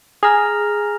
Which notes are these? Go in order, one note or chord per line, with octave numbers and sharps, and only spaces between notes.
G#4 A#5 F6 A#6 F7